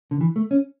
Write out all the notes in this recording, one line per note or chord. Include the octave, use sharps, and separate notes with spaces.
D3
E3
A3
C#4